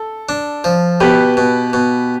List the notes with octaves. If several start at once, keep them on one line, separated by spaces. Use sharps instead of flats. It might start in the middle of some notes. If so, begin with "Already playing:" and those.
Already playing: A4
D4
F3
B2 G4 B4
B2
B2